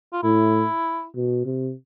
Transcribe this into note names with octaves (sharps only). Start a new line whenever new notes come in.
F4
A2 E4
B2
C3